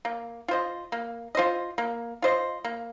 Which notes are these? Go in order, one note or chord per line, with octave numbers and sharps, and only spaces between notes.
A#3
F4 C5 D#5
A#3
F4 C5 D#5
A#3
F4 C5 D#5
A#3